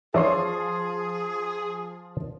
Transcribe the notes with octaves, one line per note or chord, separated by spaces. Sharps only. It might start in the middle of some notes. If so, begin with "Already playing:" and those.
F3 G#4 C#5 D5 E5 C6